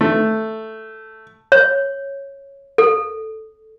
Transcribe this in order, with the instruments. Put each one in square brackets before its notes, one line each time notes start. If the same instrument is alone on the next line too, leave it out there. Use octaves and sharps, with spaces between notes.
[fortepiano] A3
[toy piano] C#5
A4